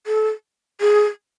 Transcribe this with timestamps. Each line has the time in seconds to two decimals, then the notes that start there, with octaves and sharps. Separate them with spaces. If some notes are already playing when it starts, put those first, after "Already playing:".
0.07 A4
0.81 G#4